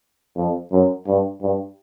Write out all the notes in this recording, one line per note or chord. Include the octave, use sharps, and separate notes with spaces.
F2
F#2
G2
G2